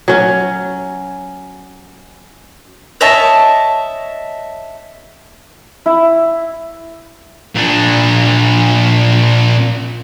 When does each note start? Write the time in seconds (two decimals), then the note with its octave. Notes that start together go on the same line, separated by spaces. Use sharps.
0.08 F#3 C#4
3.01 C#5 D#5 E5 A5
5.86 E4
7.55 A#2 D4